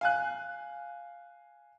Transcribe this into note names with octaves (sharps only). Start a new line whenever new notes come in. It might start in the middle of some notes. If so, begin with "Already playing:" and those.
F5 G#5 F#6